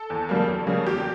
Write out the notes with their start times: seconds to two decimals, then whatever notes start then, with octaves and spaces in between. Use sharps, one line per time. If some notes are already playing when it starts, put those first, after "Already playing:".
Already playing: A4
0.10 E2
0.29 C#3 G3 A#3
0.48 E2
0.67 C#3 G3 A#3
0.86 E2 G4